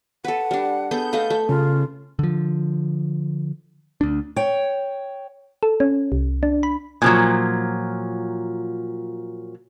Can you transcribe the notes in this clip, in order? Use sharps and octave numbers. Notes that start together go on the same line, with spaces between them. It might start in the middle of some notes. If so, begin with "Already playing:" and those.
A4 B4 F#5
G3 D4
B3 G#4 A4 G6
A3 A4 D#5 F5
A3
C#3 F4
D3 F3
D2 D4
C#5 G5
A4
C#4
C2
D4
B5
A#2 F3 F#3